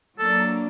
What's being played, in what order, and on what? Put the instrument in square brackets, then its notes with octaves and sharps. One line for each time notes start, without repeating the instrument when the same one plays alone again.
[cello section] F#3 A#3 D4 [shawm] A4